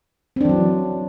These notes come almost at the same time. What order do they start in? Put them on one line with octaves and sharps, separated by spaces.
C4 D4 E3 F#3